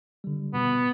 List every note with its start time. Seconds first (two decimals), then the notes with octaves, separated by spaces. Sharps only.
0.24 D3 G3
0.54 B2 B3